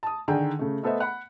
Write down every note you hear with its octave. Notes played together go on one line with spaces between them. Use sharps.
A5 D#6
D3 D#3 D#4 G#4 G5
C#3 A3
A3 B3 A4 C5 D#5 E5
F#5 B5